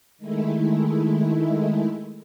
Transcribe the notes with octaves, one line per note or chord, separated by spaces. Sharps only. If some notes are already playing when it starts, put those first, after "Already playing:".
D#3 G#3 A3 E4